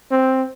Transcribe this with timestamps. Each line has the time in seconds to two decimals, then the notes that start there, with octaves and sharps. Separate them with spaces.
0.12 C4